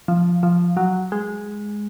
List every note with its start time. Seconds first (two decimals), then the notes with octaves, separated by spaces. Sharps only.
0.08 F3
0.43 F3
0.77 F#3
1.12 G#3